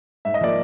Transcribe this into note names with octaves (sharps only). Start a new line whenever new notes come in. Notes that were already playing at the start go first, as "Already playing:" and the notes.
G#2 E5
D#5
F3 A#3 D5